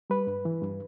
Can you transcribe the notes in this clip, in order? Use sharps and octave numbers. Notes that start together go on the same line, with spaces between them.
G3 B4
G2
E3
G2